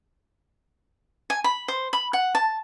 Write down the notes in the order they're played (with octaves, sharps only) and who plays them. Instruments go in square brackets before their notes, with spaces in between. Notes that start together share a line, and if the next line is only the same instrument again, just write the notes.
[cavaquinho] G#5
B5
C5
B5
F#5
A5